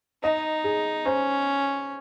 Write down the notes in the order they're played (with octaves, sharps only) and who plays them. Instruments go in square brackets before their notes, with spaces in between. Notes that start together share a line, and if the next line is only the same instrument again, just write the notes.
[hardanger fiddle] D#4 [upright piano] D#5
[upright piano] G#4
[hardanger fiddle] C#4 [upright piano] C5